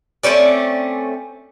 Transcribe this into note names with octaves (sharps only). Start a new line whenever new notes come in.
A3 C4 C#4 D5